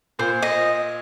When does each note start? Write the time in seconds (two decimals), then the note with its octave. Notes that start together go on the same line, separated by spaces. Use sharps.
0.19 A#2 C5
0.42 D#5